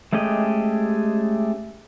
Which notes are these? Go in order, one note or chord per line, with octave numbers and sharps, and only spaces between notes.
G#3 A3 C#4 G4 D#5